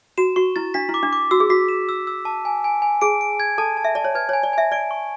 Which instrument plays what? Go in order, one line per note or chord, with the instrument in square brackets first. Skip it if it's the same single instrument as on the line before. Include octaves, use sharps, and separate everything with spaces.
[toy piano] F#4 [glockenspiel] E7
[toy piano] F#4 [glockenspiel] C#6
[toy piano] E4 [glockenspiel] A6
[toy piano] D4 [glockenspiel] B6
[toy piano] E4
[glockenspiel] D6
[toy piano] D4
[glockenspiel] D6
[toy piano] F#4 [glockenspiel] E6
[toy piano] G#4
[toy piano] F#4 [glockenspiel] B6
[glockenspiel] E7
E6
E6
A5
G#5
G#5
G#5
[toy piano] G#4 [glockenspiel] D7
[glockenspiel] D7
G#6
[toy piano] A4 [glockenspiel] A5
[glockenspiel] A5
[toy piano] E5
[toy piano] D5 [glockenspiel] A5
[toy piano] C#5
[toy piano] B4 [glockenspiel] G#6
[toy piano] C#5 [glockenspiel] G#5
[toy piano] D5
[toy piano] E5 [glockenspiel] G#5
[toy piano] D5 [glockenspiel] D7
[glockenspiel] C#6